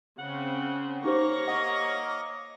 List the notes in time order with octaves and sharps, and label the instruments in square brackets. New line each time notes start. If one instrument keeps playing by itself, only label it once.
[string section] C#3 C4 [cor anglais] F#5
[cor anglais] A#3 [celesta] D#4 G4 C5 [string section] C#5 C#6 A#6
[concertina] D#5 [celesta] F#5